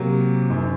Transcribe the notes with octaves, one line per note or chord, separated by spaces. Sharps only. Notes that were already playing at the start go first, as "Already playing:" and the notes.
Already playing: C3 F#3 A#3
F#1 F#2 D#3